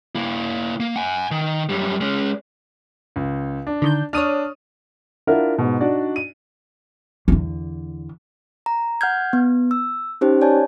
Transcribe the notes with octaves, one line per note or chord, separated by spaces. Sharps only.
A#3 E4
A#3
F#5 G#5
D#3
F#2 G3
G#3 C#4
C#2
D4
D3 D#3 G6
D4 C#5 D#6 F6 D#7
D4 E4 F4 A#4 E5 F#5
G#2 B2
D4 D#4 F#4 D5
D#7
E2 D3
A#5
F#5 F6 G6 G#6
B3
E6
C#4 D#4 G4 C5
C#5 D5 G#5 A5